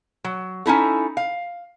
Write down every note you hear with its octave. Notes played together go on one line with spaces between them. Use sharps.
F#3
C#4 D#4 E4 A4
F5